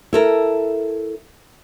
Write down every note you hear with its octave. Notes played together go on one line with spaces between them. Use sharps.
E4 A4 A#4